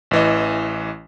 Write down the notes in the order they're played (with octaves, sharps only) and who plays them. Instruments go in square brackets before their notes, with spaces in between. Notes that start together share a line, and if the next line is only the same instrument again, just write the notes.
[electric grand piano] A1 E3 D#5